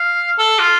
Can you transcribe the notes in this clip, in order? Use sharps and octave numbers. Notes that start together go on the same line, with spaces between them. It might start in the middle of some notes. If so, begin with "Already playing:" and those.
Already playing: F5
A4
F4